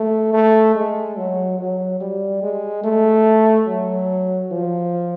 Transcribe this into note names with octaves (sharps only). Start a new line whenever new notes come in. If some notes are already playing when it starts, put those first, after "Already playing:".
Already playing: A3
A3
G#3
F#3
F#3
G3
G#3
A3
F#3
F3